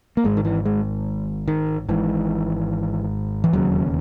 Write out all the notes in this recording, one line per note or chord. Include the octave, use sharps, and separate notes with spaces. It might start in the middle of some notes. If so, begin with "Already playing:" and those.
A#3
G#1 G#2 G#3
D#3
E3
G#3
D#3
G#1 G#2 E3
E3
E1 D#2 C#3 F#3